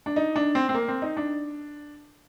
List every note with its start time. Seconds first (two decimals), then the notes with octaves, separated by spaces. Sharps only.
0.06 D4
0.16 D#4
0.36 D4
0.55 C4
0.69 C4
0.74 A#3
0.88 C4
1.02 D#4
1.17 D4